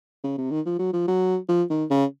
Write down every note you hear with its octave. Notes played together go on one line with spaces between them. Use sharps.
C#3
C3
D#3
F3
F#3
F3
F#3
F3
D#3
C#3